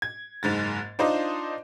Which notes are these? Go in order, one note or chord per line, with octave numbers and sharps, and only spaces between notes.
G#6
F#1 G#2 G#3 A6
D4 D#4 F4 C5 D5 D#5